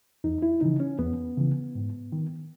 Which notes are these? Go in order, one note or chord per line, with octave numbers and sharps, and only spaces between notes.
E2 D#4
E4
C#3 E3 D#4
C#4
E2 B3
C#3 E3
G#2
D#3